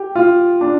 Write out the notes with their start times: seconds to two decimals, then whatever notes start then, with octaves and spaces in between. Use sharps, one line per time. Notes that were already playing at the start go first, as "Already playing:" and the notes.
Already playing: G4
0.15 F4
0.61 D4